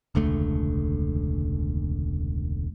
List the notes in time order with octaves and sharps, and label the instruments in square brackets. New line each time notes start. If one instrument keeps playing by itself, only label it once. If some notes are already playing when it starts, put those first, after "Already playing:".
[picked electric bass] E1 C#2 D3 A3